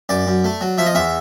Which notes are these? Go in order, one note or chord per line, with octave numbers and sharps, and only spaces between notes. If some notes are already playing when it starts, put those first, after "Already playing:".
F#2 D5
F#2
A3
F#3
F3 E5
D#5
E2 E5